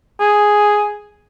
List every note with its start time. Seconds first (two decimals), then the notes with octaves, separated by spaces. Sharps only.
0.21 G#4